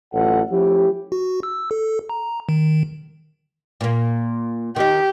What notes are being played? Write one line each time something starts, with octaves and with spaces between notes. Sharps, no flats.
A1 F#3 F4 A4 F#5
F3 A3 C#4 E4 G4
F#4
E6
A4
A#5
D#3
A#2 A#3
D#3 D#4 G4